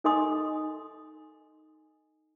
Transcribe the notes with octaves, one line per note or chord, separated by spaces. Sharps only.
D#4 A4 D#5 G#5 C6 D#6